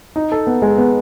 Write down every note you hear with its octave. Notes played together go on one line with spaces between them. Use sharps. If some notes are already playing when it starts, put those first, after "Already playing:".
D#4
A4
B3
G#3
B3